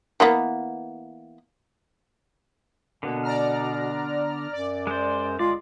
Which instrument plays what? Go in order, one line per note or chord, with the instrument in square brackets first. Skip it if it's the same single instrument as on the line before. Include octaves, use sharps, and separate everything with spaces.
[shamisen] E3 A#3 B3
[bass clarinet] B2 [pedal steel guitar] D3 B3 [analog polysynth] A#3
[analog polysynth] D5 A#5 F6
[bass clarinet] F#2 [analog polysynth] D5
[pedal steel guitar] G#3 C5
[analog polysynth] G1 G#3 [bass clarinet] F4 [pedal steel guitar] D5